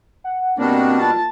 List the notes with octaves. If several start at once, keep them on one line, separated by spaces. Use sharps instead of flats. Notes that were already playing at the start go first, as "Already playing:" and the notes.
F#5
B2 G3 A#3 C4 D4 F#4
F4 A5